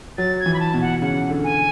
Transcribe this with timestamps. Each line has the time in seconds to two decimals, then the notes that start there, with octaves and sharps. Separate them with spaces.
0.18 F#3 A6
0.39 G#6
0.46 E3
0.54 B5
0.60 A5
0.74 B2
0.81 F#5
1.02 C#3 F#5
1.30 D3
1.44 G#5